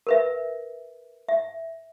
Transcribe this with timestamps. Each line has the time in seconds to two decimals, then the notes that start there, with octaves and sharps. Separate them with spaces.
0.07 A#4 B4 E5
1.29 E5